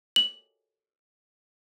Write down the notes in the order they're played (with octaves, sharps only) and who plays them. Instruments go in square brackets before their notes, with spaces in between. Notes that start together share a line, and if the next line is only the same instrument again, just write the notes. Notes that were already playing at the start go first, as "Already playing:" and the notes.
[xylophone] F#7